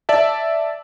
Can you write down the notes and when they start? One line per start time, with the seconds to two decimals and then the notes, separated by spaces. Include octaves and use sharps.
0.09 D5 E5 A5